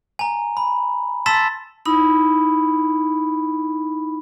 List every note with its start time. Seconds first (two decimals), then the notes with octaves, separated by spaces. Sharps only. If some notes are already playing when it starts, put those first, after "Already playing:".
0.19 G#5 A#5
0.57 B5
1.26 A5 C6 E6 A6 B6 E7
1.86 D#4 E4 B5